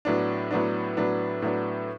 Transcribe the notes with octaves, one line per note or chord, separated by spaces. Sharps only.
A2 F#3 B3 D4
A2 F#3 B3 D4
A2 F#3 B3 D4
A2 F#3 B3 D4